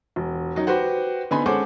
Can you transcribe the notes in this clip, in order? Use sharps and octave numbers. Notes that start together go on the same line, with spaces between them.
E1
D#3 F#3 D#4
F#4 G4 B4 C5 F#5
D3 B3 D#4 G#5 B5 C6
G#3 C#4 A4 C5 F#5 D6